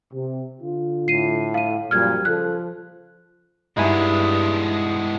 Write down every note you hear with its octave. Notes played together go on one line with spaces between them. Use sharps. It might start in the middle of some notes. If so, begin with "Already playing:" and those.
C3
D3 F4
A2 C7 D#7
F5 D#7
F#2 A#2 F3 G3 F6 G#6
C#3 F3 A4 F#6
G2 G#3 B3 D#4 E4 G#5